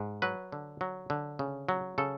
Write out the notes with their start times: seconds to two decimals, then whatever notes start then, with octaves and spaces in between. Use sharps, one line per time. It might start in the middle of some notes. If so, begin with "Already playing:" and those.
Already playing: G#2
0.22 F#3 B4
0.52 D3
0.81 F#3
1.10 D3
1.39 C#3
1.69 F#3
1.98 C#3 A4